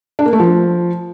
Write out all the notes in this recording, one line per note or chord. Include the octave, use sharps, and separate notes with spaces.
D4
A#3
A3
F3